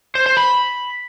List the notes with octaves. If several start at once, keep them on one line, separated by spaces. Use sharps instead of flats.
C5
C5
B5